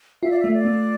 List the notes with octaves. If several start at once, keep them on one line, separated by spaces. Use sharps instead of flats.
F4 E5
D5
E5
A3
D5
A3